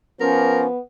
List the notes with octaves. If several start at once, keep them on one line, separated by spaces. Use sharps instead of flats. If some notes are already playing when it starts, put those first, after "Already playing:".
F3 B3 C#4 A#4